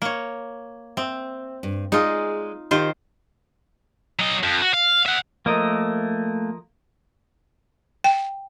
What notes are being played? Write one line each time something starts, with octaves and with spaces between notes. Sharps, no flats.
A#3 C#5
C4 E5
G2
G#3 D#4 F4 G#4 D5
D#3 F4 G4 C5
F#3 D#5
F2
F#4
F5
E5 F#5
F3 A3 A#3 A#4 D#5
G5